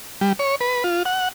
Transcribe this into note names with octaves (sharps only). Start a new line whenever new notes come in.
G3
C#5
B4
F4
F#5